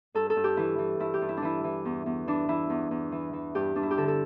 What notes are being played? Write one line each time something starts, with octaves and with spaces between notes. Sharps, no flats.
G2 A4
A4
G2
G4
E3 E4
E3
G2 E4
G4
G2
E4
D4
E3 E4
E3
E2
E2
E3 D4
E3 E4
E2
E2
E3
E3
G2 G4
G2 D4
E4
G4
D3 A4
A4